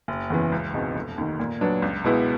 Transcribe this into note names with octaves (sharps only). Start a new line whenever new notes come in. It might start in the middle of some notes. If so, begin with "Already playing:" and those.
F#1
E2 C#3 E3
C#2
B2 G#3 C4 D#4
F1
D#2 D#3
A#2
F#3 B3 D4
C#2
B2 G#3 B3 E4